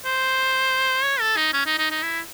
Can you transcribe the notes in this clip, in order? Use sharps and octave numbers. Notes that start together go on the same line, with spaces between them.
C5
C#5
A4
D#4
C#4
D#4
D#4
D#4
E4